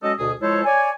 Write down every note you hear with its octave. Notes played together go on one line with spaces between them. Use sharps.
F#3 G#3 C#4 A4 D#5
D2 B2 D4 G#4 D#6
F3 G#3 E4 A4 C5 C#5
C#5 D5 G#5